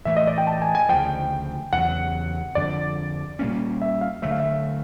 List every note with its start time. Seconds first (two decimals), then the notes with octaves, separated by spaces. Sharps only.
0.05 A2 E3 A3 E5
0.17 D#5
0.27 D5
0.38 G5
0.47 A5
0.62 G#5
0.75 G#5
0.89 D2 C#3 F3 G5
1.73 E2 C#3 F#3 F#5
2.55 F2 D3 F3 D5
3.39 A#2 G3 A#3 C#4
3.82 E5
4.01 F5
4.22 D2 D3 F#3 A3 E5
4.31 F5
4.40 E5